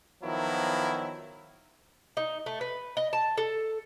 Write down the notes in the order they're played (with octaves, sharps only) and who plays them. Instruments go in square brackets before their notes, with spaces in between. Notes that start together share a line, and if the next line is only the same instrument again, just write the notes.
[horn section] D#3 F3 F#3 B3 E4
[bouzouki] D#4
A3
B4
D#5
A5
A4